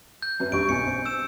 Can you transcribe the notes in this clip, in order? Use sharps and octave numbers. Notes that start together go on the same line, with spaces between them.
G6
F#2 B4
A1 G2 C#6 D7
B1 G#5 C#7
C4
E6 E7